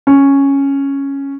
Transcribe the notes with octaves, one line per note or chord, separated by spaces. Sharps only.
C#4